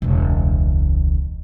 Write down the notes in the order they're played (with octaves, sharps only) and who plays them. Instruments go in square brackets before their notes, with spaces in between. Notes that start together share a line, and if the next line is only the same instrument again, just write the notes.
[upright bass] E1 C#2